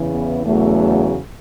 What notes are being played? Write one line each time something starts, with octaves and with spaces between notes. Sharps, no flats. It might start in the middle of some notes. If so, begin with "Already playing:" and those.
Already playing: E2 C#3 E3
B3
E2 C#3 F#3 A3